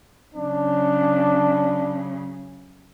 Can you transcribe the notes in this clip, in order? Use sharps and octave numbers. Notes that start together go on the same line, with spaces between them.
C#3 F#3 D4